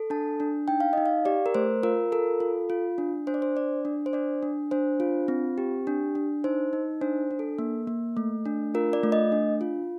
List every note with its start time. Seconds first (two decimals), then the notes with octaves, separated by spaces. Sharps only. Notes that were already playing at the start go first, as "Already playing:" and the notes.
Already playing: A4
0.10 D4 A5
0.40 D4
0.68 D#4 G5
0.80 F5
0.93 D#4 D#5
1.06 F5
1.25 G4 D5
1.46 A#4
1.54 A3 C5
1.83 F4 A#4
2.12 A4 A#4
2.40 F4
2.70 F4
2.98 D4
3.27 D4 C5
3.34 D5
3.42 C5
3.56 D4 D5
3.85 D4
4.06 C5
4.13 D4 D5
4.43 D4
4.71 D4 C5
5.00 F4
5.28 C4
5.58 G4
5.87 D4
6.15 D4
6.44 D#4 C5
6.73 D#4
7.01 D4 C5
7.31 D4
7.39 A4
7.59 A#3
7.87 A#3
8.17 A3
8.46 D4
8.75 F4 A#4
8.93 D5
9.03 A3
9.12 D#5
9.32 D4
9.61 F4